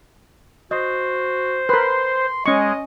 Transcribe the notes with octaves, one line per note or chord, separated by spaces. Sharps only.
F#4 C5 D#5
A#4 B4 C6
G#3 C#4 D#5 C#6